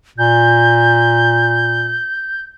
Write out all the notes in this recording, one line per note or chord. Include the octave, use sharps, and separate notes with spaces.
A#2 G6